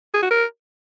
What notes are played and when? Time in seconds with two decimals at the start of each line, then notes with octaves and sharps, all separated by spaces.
0.14 G#4
0.22 F#4
0.31 A#4